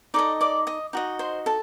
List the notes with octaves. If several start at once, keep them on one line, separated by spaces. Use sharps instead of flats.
D#4 A4 D5 D#5 D6
D5 D6
D#5 D#6
D#4 F#4 D#5
C5 C6
A4 A5